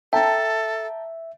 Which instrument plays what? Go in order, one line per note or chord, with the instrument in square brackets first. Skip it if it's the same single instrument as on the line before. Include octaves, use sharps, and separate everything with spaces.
[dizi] A4 [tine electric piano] E5 [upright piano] G5 A5 A#5